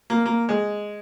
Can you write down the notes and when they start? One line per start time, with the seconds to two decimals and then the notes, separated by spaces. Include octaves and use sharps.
0.10 A#3
0.26 A#3
0.49 G#3